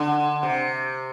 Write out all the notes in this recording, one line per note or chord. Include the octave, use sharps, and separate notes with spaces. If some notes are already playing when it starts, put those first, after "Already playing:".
Already playing: D3
C3